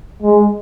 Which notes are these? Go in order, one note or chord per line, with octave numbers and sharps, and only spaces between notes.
G#3